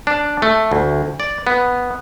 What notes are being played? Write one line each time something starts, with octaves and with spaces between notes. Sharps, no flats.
D4
A3
D2
D5
B3